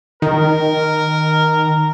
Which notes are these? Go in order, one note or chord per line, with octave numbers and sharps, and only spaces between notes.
D#3 A#4